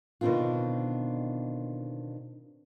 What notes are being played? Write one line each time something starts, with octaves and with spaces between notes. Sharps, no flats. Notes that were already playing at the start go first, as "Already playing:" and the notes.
B2 D3 D#3 C4 D4 F4